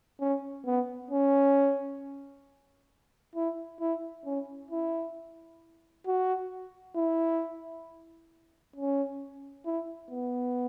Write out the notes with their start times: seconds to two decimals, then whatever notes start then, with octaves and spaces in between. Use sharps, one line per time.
0.20 C#4
0.66 B3
1.11 C#4
3.36 E4
3.81 E4
4.26 C#4
4.71 E4
6.07 F#4
6.96 E4
8.76 C#4
9.66 E4
10.11 B3